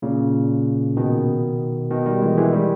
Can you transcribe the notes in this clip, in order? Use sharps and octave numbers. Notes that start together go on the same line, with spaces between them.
A#2 C#3
B2 D#3
B2 D#3
D#3 G3
E3 G#3
E3 G#3
D#3 G3